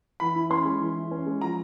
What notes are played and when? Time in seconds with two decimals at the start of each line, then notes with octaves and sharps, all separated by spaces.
0.20 E3 B5
0.36 E4
0.50 C#4 C6
0.65 G#3
0.80 E3
0.96 E4
1.11 C#4
1.26 G#3
1.41 F3 A#5